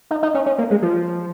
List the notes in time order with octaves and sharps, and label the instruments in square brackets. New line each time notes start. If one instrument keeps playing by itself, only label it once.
[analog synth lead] D#4
D#4
C#4
C#4
A#3
G#3
F3